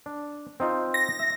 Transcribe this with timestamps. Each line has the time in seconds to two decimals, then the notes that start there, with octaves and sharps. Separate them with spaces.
0.06 D4
0.60 C4 D#4 F4
0.94 A#6
1.19 E5